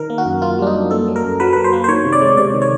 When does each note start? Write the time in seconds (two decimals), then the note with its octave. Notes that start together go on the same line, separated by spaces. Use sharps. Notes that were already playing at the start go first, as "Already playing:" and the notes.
Already playing: D#3 A#4
0.10 A#3
0.18 F#4
0.26 F#2
0.42 A#3 F4
0.58 G3 D4
0.67 D#4
0.74 F#2
0.91 A#3 A4
1.08 F#3
1.16 A#4
1.24 F#2
1.40 F#3 B4
1.53 F#3 B4
1.64 C5
1.73 A#3
1.84 C5
1.88 D#3 C#5
2.04 C3
2.12 D5
2.22 G#3
2.37 C3 D5
2.54 D#3
2.62 C#5